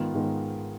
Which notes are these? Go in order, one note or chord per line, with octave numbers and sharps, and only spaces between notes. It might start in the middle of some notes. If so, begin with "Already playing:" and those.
Already playing: G#2 D#3 B3 F4
G#2 D#3 G#3 B3 F4